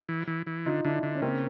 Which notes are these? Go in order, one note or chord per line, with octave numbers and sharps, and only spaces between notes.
E3
E3
E3
D3 D#4 F4
D3 D4 E4
D3
C#4
C#3 A#3 C4